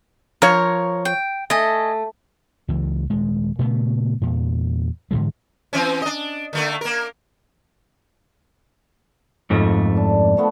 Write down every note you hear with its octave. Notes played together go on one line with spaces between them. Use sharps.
F3 A#4 C#5
G5
A3 D#5 G#5
C#2 E3
D#1 G#3
A#2 C#3 A3 B3
E2 A#2
G#2 D3 E3 G#3
E3 C4 C#4
D4 D#5
D3 A3 A#3
A#3 A#4
F2 G#2 A3
D4
F3 A3 B3